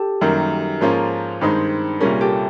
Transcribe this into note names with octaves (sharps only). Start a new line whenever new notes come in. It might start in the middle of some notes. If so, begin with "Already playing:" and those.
Already playing: G4 A4
F#2 D#3 G3 A#3
G#2 F3 A#3 C#4 F4
G2 D#3 G#3 C4 D#4
C2 A#2 G3 A#3 C#4 G#4 A#4
G4 A4